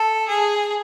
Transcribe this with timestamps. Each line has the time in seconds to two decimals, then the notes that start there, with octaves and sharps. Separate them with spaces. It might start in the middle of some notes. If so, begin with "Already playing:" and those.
Already playing: A4
0.28 G#4